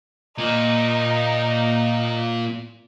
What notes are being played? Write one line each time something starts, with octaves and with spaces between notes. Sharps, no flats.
A#2 D#4